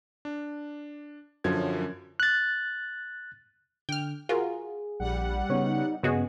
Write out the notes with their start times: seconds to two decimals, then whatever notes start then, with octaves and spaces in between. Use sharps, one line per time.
0.25 D4
1.44 F#2 D3 F3 G#6
2.20 F#6 A6
3.89 D3 G5 F6
4.29 F4 F#4 G#4 A#4
5.00 A#1 G3 F#5
5.50 C#3 B3 D#4 C#5
6.03 G2 C#3 B3 F#4 G#4 D#5